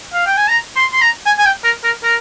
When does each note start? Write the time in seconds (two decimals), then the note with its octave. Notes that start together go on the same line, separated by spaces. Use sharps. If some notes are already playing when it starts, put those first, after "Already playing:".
0.14 F5
0.26 G5
0.37 G#5
0.49 A#5
0.76 C6
0.93 C6
1.01 A#5
1.26 G#5
1.39 G#5
1.45 G5
1.64 A#4
1.84 A#4
2.03 A#4